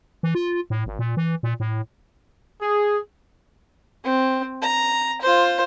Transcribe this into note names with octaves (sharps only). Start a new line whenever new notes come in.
E3
F4
A2
G#1
A#2
E3
A#2
A2
G#4
C4
A#5
F4 C5